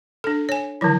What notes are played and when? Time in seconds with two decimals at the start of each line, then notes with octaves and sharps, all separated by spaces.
0.24 D4 A4
0.49 C#5 G#5
0.81 D3 D#3 F3 F#3 E4